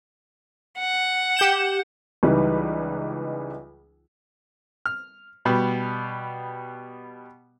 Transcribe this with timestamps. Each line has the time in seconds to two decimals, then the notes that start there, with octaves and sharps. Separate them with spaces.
0.79 F#5
1.37 G4 G6 E7
2.23 C#2 E3 G3 D#4 B4
4.86 F6
5.45 B2 G3 B3